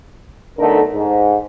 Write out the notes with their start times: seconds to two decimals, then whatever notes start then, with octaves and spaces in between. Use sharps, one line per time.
0.59 B1 D3 A3 D#4 A#4
0.94 G#2